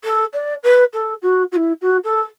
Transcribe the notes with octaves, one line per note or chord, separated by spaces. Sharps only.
A4
D5
B4
A4
F#4
F#4
E4
F#4
A4